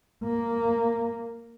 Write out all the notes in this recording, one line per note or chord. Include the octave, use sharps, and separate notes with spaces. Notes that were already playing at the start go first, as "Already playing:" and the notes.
A#3